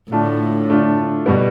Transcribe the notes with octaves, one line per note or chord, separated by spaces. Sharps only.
A2 D3 A3 D4 F4
D3 A3 D4 F4
B2 G3 B3